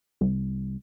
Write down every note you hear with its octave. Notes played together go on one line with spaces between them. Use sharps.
C2